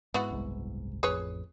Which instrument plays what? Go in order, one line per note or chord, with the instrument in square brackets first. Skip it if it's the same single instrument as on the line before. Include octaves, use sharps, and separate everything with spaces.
[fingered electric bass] G#2 [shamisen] B3 E4 F#4
[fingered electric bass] F#1 C2 G#2
[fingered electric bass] A1 F2 [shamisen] G#4 B4 C#5